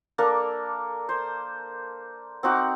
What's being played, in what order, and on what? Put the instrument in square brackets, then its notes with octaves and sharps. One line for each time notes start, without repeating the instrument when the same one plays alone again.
[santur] A#3 D4 A4 A#4
C5
C4 D#4 F#4 D6